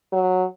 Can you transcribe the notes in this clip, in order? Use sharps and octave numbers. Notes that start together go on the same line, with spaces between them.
F#3